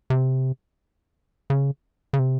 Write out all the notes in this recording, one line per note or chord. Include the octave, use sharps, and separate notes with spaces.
C3
C#3
C#3
C3